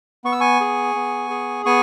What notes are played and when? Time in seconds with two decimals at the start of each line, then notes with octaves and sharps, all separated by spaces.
0.24 B3 C#6
0.32 E6
0.41 G#5 C#6
0.60 G#4
0.95 B3
1.30 G#4
1.66 B3 G#5 C#6